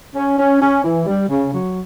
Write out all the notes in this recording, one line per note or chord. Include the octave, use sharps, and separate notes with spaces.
C#4
C#4
C#4
E3
G3
C#3
F#3